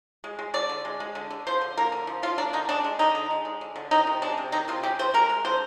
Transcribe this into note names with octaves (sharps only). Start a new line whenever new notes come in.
G#3
G#3
D3 D5
D3
G#3
G#3
D3
D3
F3 C5
D3
A#3 A#4
D3
F3
D3 F4
A#3 D4
D3 D#4
G#3 D4
G#3
D3 D#4
D3
G#3
G#3
D3
D3
D#3 D#4
C3
G#3 D4
C3
D#3 D#4
C3 F4
G#3 G4
C3 C5
G#3 A#4
G#3
D3 C5